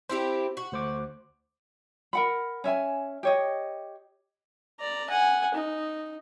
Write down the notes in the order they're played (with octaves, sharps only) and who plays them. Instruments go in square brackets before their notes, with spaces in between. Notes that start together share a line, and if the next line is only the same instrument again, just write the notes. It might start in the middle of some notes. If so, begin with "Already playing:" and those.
[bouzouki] C4 E4 G4 [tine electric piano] C5
[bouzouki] F#4
[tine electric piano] D2 C5 D6
[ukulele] A#4 F#5 B5
C#4 E5 G#5
G4 C#5 D#5
[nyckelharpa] D5 A#5
F#5 G#5
D#4